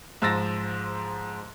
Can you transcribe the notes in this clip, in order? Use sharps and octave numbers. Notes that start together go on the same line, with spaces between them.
G#2 F3 E6 A6 A#6